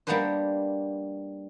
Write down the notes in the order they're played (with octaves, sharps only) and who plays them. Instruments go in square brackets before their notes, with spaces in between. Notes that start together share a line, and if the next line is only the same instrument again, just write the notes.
[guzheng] G3 A#3 B3 D4 B4 C5